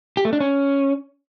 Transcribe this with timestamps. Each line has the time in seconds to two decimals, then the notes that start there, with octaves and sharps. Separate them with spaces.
0.17 G4
0.25 A3
0.33 D4
0.40 C#4